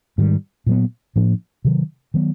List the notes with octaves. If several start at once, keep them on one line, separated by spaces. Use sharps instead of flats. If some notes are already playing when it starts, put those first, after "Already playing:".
G#2 D#3 G3
A#2 F#3 B3
A2 F3 A#3 D4
C3 D#3 F#3
D#3 F#3 B3